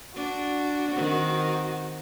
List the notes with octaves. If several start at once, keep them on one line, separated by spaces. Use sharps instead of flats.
D4 F#4
D#3 C4